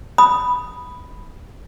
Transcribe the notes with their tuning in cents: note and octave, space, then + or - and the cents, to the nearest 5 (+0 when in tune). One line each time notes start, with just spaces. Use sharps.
B5 +0 D#6 +0